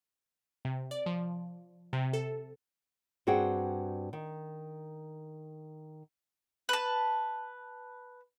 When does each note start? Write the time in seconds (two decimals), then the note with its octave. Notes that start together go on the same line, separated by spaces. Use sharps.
0.65 C3
0.91 D5
1.06 F3
1.93 C3
2.13 A4
3.27 G2 C4 F#4 G#4 F#5 G5
4.13 D#3
6.69 B4 A5